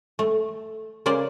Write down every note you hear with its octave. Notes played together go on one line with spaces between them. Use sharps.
A3
C#3 A#3 C5 D5